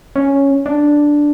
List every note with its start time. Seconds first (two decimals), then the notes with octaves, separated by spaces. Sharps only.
0.16 C#4
0.66 D4